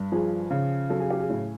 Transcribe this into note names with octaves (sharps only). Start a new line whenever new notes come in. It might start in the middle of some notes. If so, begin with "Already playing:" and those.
Already playing: G2
F3 G#4
C#3
F#3 A4
G#4
G4
G#4
A2